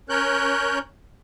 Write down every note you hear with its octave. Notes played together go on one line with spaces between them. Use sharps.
C#4 A#4 C#5 F#6 G6